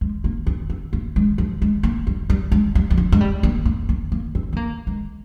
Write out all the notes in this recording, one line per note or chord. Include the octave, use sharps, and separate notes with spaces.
G#3
A#3
C4
C4
A#3
G#3
F3
G#3
A#3
G3
G3
G#3
G3
G3
F3
G#3
G3
A#3
A#3
A#3
A#3
C4
C4
A#3
G#3